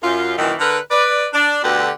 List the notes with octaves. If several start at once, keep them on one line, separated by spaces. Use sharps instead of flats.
F#2 F4
F#2 A#2 D#3 E3
D3 A#4 B4
B4 D5
D4
D2 B2 D3 G4 B4 F#5